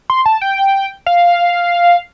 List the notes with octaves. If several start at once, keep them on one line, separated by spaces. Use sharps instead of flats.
C6
A5
G5
F5